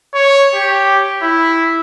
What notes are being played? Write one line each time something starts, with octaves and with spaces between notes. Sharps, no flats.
C#5
G4
E4